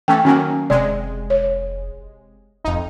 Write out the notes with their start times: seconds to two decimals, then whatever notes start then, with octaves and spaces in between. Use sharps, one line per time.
0.08 E3 A3 C#4 G5
0.25 D#3 F#3 A#3 C#4 G#5
0.70 F1 C3 G#3 D5
1.30 C#5
2.64 F1 F2 D#4